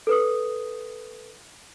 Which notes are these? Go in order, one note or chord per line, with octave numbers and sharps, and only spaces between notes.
A4 B4 D#6